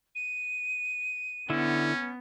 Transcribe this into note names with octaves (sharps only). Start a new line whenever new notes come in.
D#7
D3 B3 C#4 E4